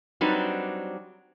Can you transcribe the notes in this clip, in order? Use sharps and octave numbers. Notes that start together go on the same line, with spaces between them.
F#3 G3 C4 D4 D#4 B4